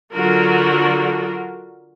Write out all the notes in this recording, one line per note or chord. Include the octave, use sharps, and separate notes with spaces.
D3 F#3 D4 F4 F#4 A#4